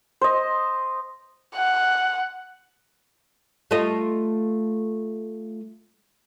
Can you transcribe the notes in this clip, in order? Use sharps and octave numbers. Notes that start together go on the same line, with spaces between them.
C5 D#5
F#5
A3 F4 D#5